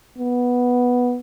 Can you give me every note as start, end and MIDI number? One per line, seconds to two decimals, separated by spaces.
0.18 1.19 59